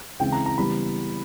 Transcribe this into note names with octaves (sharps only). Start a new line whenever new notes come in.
C#3 E3 G#3 C4 E4 G5
A#5
A#5
C#3 E3 G3 B3 B5